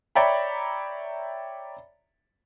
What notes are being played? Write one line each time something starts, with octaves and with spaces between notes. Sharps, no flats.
C#5 D5 E5 G5 A#5 B5